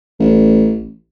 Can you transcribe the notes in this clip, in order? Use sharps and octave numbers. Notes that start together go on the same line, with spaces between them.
A1